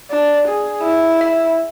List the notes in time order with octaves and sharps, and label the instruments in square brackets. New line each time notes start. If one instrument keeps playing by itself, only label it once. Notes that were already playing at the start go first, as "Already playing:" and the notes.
[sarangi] D4
G#4
E4
[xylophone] E5